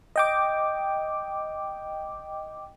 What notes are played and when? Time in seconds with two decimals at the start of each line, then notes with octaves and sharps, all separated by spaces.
0.16 D#5 G5 D6